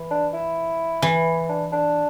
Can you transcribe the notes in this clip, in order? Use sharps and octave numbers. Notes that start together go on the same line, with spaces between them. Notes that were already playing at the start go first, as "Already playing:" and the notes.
Already playing: E3
D4
E4
E3
D4
D4